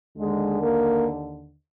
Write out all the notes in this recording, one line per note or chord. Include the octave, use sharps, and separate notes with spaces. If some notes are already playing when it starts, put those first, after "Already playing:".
D#2 D3 G#3
A#3